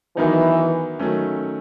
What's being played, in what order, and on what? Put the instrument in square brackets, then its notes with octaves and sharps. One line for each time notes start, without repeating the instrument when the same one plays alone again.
[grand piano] D#3 F#3 B3 D#4 [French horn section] E3
[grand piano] D#3 F#3 A3 C#4